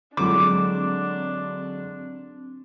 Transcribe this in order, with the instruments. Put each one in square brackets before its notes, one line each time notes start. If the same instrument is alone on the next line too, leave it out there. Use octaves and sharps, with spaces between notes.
[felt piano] D3 F#3 G#3 [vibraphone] C4 [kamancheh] D4 [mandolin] D6